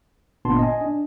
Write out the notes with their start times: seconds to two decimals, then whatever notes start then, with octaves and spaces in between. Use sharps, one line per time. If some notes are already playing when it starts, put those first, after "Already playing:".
0.45 G1 A#2 B3 D4 A5 C6
0.59 D#5 G#5
0.81 D4